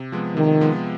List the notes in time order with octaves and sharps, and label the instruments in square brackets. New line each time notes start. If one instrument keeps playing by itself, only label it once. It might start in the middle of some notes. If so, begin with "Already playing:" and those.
Already playing: [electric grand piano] C3
F3 G#3 B3
[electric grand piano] C3 [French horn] D#3
[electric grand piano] F3 G#3 B3